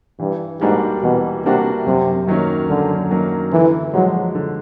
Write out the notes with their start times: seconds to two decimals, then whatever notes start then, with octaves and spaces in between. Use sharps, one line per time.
0.20 G2 E3
0.61 G#2 G3 A#3 D4 F#4
1.03 B2 E3
1.44 C3 G3 A#3 D4 F#4
1.86 F#2 C3
2.27 D#3 F#3 A#3 C#4
2.69 F#2 D3
3.11 D#3 F#3 A#3 C#4
3.52 D3 E3
3.94 F3 F#3 G#3
4.35 D3